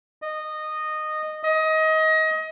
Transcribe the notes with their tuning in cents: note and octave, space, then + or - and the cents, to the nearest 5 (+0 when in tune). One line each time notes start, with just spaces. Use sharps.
D#5 -15
D#5 +25